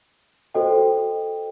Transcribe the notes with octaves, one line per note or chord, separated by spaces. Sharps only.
F#4 A4 C5 D#5 G5